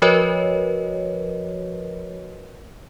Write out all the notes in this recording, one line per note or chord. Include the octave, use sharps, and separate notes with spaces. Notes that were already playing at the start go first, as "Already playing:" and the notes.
F3 F#4 A#4 B4 C#5 D#5